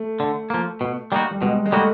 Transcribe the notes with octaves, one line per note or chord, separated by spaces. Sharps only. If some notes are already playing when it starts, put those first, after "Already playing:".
Already playing: A3
D3
F3 A#3
B2
G3 A#3 D#4 F#4
G3
B2 G#3
G#3
G3 A3 A#3 D#4 F#4